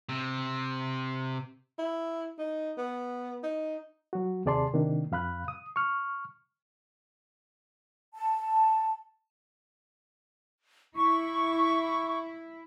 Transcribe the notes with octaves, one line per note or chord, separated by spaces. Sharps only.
C3
E4
D#4
B3
D#4
F#3 F#4
D#2 C3 G#4 D5 A5 C6
C3 D#3 A#3 D4
F2 F5 B5 F#6
D#6
C#6 F6
A5
E4 C#6